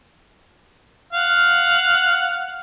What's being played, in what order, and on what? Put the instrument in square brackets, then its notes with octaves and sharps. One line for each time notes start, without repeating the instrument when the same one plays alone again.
[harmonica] F5 F#5